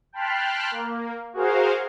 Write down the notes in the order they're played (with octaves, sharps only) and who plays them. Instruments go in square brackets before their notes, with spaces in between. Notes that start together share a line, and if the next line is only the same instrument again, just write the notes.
[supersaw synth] G5 A5 B5 C6 F6 F#6
A#3
F#4 G#4 A#4 C5 F5